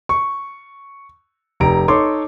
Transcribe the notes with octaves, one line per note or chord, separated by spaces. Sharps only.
C#6
F1 G4 A#5 D7
D#4 A4 C#5 C6 D6